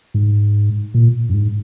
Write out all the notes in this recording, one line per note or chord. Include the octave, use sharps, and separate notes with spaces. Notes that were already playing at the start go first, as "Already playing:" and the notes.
G#2
A#2
F#2
G#2